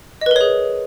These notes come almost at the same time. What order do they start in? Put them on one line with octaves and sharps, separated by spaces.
D#5 B4 A#4 C#5 G#4